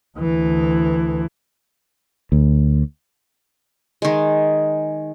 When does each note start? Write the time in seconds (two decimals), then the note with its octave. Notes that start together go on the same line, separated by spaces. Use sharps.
0.18 D2 E3
2.32 D2
4.02 D#3 G#3